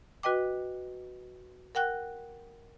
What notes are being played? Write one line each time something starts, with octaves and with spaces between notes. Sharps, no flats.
F#4 B4 D#5 G5 D6
A#4 F#5 G5 F#6